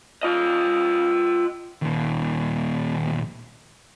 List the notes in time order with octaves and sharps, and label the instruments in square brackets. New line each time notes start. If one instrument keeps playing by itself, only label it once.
[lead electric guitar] F4 D#5
D#2 A#2